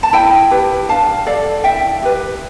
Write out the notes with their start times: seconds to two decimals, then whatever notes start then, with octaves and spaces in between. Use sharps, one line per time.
0.03 A5
0.13 E4 G5 B5
0.51 G4 B4
0.88 D4 F5 A5
1.26 A4 D5 F5
1.64 E4 E5 G5
2.03 G4 B4